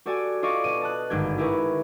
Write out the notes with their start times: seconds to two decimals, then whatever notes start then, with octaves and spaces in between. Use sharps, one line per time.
0.06 F#4 G4 A4 D5 G#5
0.43 F4 D5 D#5 C#6 D6
0.64 B2 D#7
0.81 A5 D#6 F#6
1.10 G#1 G2 D3 G4 G6 G#6
1.38 E4 G4 G#4 A#4 B4 C#6